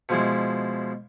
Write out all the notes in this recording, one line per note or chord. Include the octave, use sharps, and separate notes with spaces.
B2 F3 G#3 E4